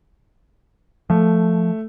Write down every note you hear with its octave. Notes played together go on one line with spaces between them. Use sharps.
F3 A3